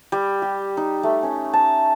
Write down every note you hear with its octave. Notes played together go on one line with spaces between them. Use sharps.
G3
G4
D#4
A3
C#4
A5